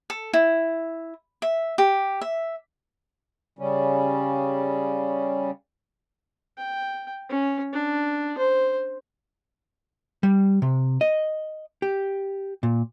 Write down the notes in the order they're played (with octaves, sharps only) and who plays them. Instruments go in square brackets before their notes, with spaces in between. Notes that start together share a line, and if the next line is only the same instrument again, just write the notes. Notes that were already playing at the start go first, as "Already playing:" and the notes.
[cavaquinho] A4
E4
E5
G4
E5
[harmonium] C#3 G3 C#4
[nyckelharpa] G5
C#4
D4
C5
[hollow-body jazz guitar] G3
C3
D#5
G4
A#2